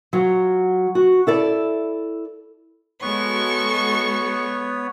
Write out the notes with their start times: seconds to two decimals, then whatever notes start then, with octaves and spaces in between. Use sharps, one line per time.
0.13 F#3 F4
0.95 F#4
1.27 E4 A4 D5
3.02 G#3 B3 F#4 A4 C#5 C#6